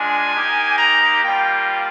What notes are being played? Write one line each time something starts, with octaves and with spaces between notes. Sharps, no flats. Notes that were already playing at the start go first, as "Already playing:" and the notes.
Already playing: G#3 D4 F4 G#5
A#3 D#4 G4
A#5
G3 A#3 F4 G5